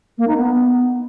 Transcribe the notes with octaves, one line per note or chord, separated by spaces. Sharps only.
A#3
D#4
B3